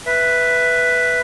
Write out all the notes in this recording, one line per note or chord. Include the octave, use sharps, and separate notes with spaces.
B4 E5